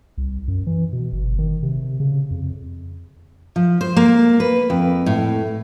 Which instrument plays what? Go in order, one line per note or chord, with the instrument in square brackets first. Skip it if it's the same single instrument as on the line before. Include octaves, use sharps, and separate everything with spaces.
[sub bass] C2
F#2
E3
B2
G1
D#3
C3
C#3
F2
[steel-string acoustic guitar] F3
C5
A#3
B4
F2
A2